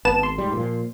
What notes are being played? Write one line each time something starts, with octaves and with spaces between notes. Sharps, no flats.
G#1 B3 A5 E7
C6
G#2 G3
A#2 F3